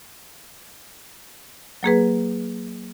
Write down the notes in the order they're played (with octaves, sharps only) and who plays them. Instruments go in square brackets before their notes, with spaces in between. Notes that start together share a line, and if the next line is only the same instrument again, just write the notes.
[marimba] F#3 A#3 G#4 B4